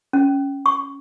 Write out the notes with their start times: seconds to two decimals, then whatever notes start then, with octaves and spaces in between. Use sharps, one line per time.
0.13 C#4
0.66 C#6